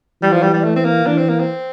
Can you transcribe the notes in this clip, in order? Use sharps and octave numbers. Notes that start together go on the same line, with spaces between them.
E3 G3
F3
G3
G3
A3
C4
A#3
E3 D4
C4
A#3
C4